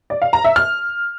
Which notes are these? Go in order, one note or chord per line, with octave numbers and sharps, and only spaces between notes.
D5
F5
A#5
E5
F6